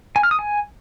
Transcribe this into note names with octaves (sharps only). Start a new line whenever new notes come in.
G#5
F6
D#6
G#5